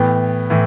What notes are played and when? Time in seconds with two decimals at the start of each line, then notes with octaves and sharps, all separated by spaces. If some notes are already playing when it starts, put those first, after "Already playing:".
Already playing: A2 E3 B3 G5
0.50 A2 E3